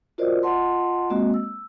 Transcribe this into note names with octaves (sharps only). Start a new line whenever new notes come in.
F4 F#4 A#4 C5 D5 D#5
F4 D#5 F#5 A5 C6
G#3 A#3 C4 F#4 D#5
E6